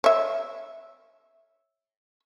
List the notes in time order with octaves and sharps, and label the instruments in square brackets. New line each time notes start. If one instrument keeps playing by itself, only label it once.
[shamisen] C#5 E5